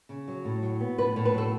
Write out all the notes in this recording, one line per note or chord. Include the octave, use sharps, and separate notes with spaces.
C#3
F#3
A2
F#3
B3
A2 B4
A2
B4
F#3 A4